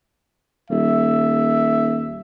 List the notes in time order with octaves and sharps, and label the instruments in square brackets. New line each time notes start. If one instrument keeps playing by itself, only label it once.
[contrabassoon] D#1 [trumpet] E5